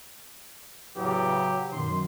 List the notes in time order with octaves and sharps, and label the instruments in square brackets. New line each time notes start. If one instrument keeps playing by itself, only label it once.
[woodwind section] E2 A2 C#3 [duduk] F#3 [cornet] G4
[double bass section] F#2 B2 D#3 [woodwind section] C6